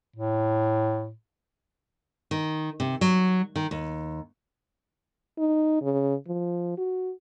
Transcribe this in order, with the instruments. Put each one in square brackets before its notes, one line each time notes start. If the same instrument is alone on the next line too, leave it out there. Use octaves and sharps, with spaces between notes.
[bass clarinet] A2
[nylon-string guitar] D#3
C3
F#3
D#3
D#2
[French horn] D#4
C#3
F3
F#4